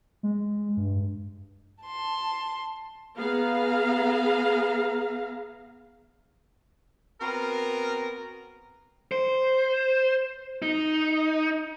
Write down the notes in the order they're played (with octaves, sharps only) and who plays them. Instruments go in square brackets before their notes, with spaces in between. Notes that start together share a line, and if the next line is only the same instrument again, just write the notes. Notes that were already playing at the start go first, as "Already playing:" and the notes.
[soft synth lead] G#3
G2
[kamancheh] A5 C6
[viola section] B3 G#4 F5 A#5
[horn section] B3 C4 F#4 A#4
[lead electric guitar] C5
D#4